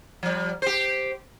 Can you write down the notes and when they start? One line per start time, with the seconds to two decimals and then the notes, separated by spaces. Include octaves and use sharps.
0.23 F3 G3
0.62 G4 C5